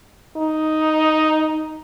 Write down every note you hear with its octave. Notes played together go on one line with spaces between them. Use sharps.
D#4